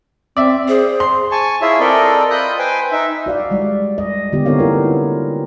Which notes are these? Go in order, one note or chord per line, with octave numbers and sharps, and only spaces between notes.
C4 D5 E5
G#4 C5
C6
G#5 A5 C#6
E4 F4 G#4 C#5 E5
C4 A4 A#4 D5 D#5
F4 D#5 B5 D#6 F#6 G6
B4 C5 G5 G#5
D#4 E5
F#4 D5 F5
G3 G#3 D5
D#5
D3 B3 F4 G4
B3 C4 D#4 A#4 C#5 F5
A#3 E4 F4 A#4 B4